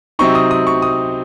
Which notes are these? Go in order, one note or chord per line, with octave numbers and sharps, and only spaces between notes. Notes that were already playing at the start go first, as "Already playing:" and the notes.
C3 F#3 C4 D#4 C#6
D#6
D#6
C#6
D#6